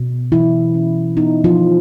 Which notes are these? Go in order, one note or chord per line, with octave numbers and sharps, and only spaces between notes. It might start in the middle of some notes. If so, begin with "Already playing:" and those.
Already playing: B2
E3 F#3 E4
C#4
B3 D#4
F3 F4
D#3